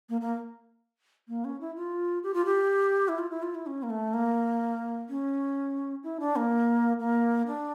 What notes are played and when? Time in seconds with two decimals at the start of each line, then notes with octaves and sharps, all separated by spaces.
0.09 A#3
0.21 A#3
1.28 A#3
1.45 C#4
1.61 E4
1.76 F4
2.23 G4
2.34 F4
2.45 G4
3.08 E4
3.19 F4
3.31 E4
3.43 F4
3.55 E4
3.67 C#4
3.83 A#3
3.90 A3
4.14 A#3
5.09 C#4
6.04 E4
6.20 D4
6.36 A#3
6.99 A#3
7.47 D4